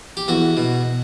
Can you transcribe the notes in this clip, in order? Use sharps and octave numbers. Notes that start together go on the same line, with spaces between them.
G4
E2 F#4
B2